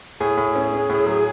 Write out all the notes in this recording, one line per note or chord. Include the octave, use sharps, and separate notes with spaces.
A2 G#4
A2
C#4
C#4
A2
F#3